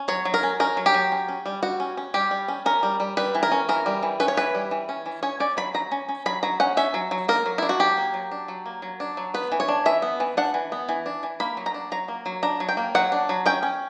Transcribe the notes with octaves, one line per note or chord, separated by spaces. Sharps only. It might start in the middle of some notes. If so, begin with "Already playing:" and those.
Already playing: C#4
F#3 C#5
F#3
A#4
C#4
C#4 A#4
F#3
G4
F#3
C#4
C#4
G3
G3 F#4
C#4
C#4
G3 G4
G3
C#4
C#4 A#4
G3
G3
G3 B4
E3
A#4
C#4
E3 A#4
G3
E3
C#4 B4
C#5
E3 B4
G3
E3
C#4
E3
C#4 C#5
C#4 D5
F#3 B5
F#3 A#5
C#4
C#4
F#3 B5
F#3 A#5
C#4 F#5
C#4 E5
F#3
F#3
A#3 A#4
F#3
D4 E4
F#4
F#3 G4
A#3
F#3
D4
F#3
A#3
F#3
D4
F#3
B3 B4
E3
C#5
D4
E3 E5
B3
E3
D4 F#5
E3
B3
E3
D4
E3
A#3 B5
F#3
A#5
D4
F#3 A#5
A#3
F#3
D4 A#5
F#3
G5
A#3
F#3 F#5
D4
F#3
C#4 G5
C#4